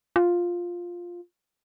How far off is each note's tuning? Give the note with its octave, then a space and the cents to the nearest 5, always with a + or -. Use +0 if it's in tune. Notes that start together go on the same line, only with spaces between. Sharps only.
F4 +5